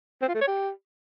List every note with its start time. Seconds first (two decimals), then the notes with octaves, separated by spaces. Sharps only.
0.22 C4
0.28 F4
0.35 A3
0.41 C#5
0.47 G4